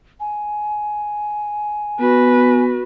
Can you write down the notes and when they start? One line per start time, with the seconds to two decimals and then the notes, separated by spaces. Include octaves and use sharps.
0.20 G#5
2.00 B3 F#4 B4